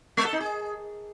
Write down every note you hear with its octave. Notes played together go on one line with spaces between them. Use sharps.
G#3
A4
D#4
G#4